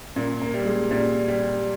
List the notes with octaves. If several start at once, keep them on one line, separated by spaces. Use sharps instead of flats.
A#2 A#3
A#3
G3
G#3
A#2 G3
G3